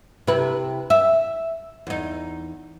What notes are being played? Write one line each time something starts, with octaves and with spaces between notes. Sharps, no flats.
C3 E4 B4
E5
E2 D#4